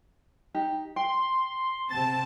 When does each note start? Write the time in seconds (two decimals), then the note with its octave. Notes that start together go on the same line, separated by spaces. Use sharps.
0.54 D#4 G4
0.96 G5 C6
1.90 C3 C4 A5 A6